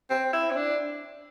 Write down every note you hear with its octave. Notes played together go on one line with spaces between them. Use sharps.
C4
E4
C4
D4